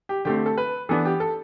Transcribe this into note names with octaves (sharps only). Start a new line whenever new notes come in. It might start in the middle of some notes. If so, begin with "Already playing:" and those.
G4
D3 A3 C4 G4
G4
A4
B4
E3 B3 D4 A4
G4
A4